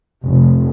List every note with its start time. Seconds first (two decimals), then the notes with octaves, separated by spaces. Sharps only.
0.24 F1